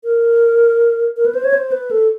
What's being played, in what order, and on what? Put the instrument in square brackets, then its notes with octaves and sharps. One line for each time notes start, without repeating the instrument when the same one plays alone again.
[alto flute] A#4
A#4
B4
C5
C#5
C5
B4
A4